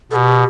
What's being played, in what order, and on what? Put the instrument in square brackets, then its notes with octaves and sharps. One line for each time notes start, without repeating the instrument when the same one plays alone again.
[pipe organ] B2 [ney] G4 A4